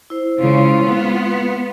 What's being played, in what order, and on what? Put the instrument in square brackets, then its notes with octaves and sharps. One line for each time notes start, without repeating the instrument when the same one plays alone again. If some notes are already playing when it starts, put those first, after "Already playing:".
[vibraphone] E4 C5
[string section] C#3 [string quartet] G#3 F4
[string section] B3
[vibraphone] B4